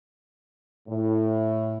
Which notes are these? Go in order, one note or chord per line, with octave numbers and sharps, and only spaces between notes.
A2